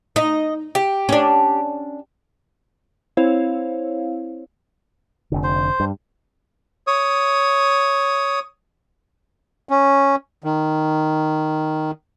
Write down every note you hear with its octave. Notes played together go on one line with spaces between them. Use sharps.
D#4 D#5
G4
C#4 D4
C4 E4 C5 C#5 F5
F1 D3
C5
G2
C#5 D#6
C#4
D#3